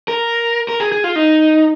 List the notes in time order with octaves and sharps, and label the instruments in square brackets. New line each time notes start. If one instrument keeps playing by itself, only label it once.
[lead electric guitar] A#4
A#4
G#4
G#4
F4
D#4